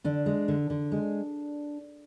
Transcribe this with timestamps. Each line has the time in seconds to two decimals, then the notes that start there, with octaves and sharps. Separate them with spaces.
0.04 D3 D4
0.26 G#3
0.48 D3
0.70 D3
0.92 G#3